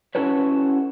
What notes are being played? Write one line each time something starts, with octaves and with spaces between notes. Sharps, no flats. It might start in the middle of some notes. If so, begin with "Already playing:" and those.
C#4 E4 F#4 A4 B4 C#5